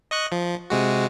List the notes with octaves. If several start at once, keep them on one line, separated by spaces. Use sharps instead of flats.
D#5 C#6 F#6
F3
C3 G#3 F#4